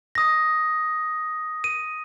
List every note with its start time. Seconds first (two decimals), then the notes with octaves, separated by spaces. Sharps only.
0.15 D#6 A#6
1.64 D#7